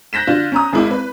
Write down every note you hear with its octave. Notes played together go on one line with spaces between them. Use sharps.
F#6 G6 A#6 B6 E7
D3 F4
C#4 A#5 D#6
G#1 G#3 E4 D6
B4